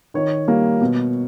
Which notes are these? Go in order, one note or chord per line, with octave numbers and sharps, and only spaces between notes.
D#3 C#5
G3 A#3
B2